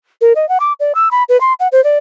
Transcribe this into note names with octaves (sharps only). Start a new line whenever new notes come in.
A#4
D#5
F#5
D6
D5
E6
B5
B4
C6
F#5
C5
D5